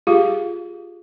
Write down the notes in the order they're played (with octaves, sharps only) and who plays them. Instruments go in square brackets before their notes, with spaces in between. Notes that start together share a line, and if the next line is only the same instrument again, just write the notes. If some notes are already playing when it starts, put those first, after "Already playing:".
[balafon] F4 G4 G#4 F5